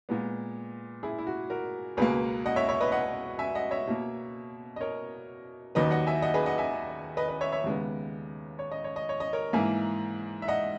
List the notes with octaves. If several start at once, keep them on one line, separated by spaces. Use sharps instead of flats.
A#2 G#3 B3
E4 G#4
E4
F#4
F#4 A#4
C#2 B2 A#3 G#4 B4
D#5 F#5
C#5 E5
C#5 E5
B4 D#5
D#5 F#5
E5 G#5
D#5 F#5
C#5 E5
B2 A#3
D#5
A#4 C#5
D#2 D#3 F#3 B4 D#5
D#5 F#5
E5 G#5
D#5 F#5
G#4 B4
D#5 F#5
E5 G#5
B4 D#5
B4 D#5
C#5 E5
C#5 E5
D#2 C#3 G#3 B3
C#5
D#5
C#5
D#5
C#5
D#5
A#4 C#5
G#2 E3 A#3 E5 G#5
E5
D#5 F#5